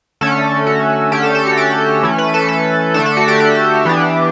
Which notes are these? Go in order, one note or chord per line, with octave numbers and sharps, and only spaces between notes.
D3 A3 C#4 A4
F#4
D3 A3 C#4 G4
A4
A4
F#4
G4
E3 A3 C#4
B4
A4
A4
D3 A3 D4 A4
A4
F#4
G4
G4
E3 B3 D4